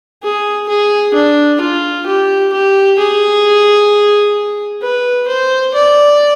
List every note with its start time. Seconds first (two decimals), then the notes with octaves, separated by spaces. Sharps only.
0.23 G#4
0.69 G#4
1.14 D4
1.61 F4
2.06 G4
2.53 G4
2.98 G#4
4.82 B4
5.28 C5
5.74 D5